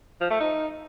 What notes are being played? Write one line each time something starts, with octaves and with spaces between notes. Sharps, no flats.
F3
A3
D#4